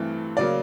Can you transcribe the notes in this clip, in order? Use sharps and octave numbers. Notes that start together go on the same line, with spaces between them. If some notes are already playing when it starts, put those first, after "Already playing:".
Already playing: G2 E3 A3 C4
C#3 F#3 A#3 D5